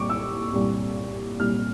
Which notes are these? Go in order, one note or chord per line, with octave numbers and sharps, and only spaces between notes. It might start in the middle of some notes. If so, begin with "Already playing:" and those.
Already playing: C2 A#2 G3 C#6 D6
E6
C2 A#2 G3
C2 A#2 G3 F6